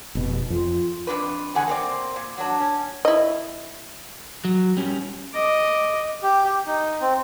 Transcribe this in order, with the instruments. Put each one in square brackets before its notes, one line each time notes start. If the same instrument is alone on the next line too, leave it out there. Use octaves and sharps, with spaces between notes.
[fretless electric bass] F1 B2
[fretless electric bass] F2 [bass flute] F4
[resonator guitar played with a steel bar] F2 C#3 D4 B4
E2 D3 G#4 F#5 G#5
A#3 C4 D5
A#2
F#3 D4
C#4
[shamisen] E4 D#5
[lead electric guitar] F#3
G3 C#4
[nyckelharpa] D#5 D6
[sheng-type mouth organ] G4
G4
D#4
C4